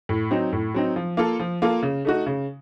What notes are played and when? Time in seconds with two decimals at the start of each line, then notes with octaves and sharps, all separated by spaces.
0.09 A2
0.31 F#3 C4 D#4
0.53 A2
0.74 F#3 C4 D#4
0.96 F3
1.17 A#3 F4 A4
1.40 F3
1.62 A#3 F4 A4
1.82 C#3
2.05 A3 D#4 F#4
2.26 C#3